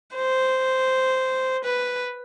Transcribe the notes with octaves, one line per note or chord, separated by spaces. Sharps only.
C5
B4